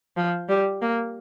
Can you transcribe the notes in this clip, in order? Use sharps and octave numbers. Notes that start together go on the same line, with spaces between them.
F3
G3
A#3